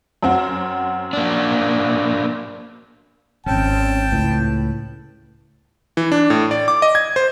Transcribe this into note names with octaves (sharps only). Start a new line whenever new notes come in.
F#2 C4 F#4
A#3 D4
D#1 G#1 C4 C#4 G5 A5
C#2 A2 B4
E3
D4
A2
D5
D6
D#5
G#6
C5